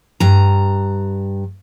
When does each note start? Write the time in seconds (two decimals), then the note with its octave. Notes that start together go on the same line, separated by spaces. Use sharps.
0.20 G2 A#5